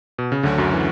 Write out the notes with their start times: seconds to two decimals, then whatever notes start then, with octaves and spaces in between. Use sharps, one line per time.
0.18 B2
0.32 C#3
0.43 D2 D3 F#3 C#4 F#4
0.58 F#2 F#3
0.73 E3